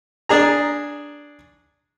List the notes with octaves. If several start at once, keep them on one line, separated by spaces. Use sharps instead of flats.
D4 G#4 A#5